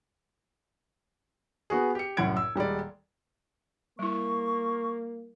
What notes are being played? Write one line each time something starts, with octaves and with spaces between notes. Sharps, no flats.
B3 F#4 G#4
G4 C#7
C2 F#2 A2 F#5 G#6 D7
E6
D#1 G3 G#3 D5
G3 A#3 E4 C#6